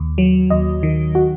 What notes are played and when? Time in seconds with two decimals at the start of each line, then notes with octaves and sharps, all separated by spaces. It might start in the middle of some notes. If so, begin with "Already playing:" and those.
Already playing: D#2
0.18 F#3
0.50 D#2 D#5
0.83 D#3
1.15 F#4